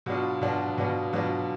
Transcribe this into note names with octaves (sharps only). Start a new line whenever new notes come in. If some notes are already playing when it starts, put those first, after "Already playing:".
B2 F#3 B3 D4 F4
B2 F#3 B3 D4 F4
B2 F#3 B3 D4 F4
B2 F#3 B3 D4 F4